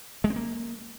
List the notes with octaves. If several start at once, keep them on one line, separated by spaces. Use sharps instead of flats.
G#3
C4
A#3